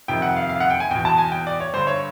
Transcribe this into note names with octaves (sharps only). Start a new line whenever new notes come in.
F2 C3 D#3 G5
F#5
F5
F5
F#5
G5
G#5
E2 B2 G5
A5
G#5
G5
D5
C#5
G2 D3 C5
C#5